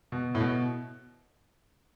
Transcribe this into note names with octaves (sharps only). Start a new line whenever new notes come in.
B2
A2
B2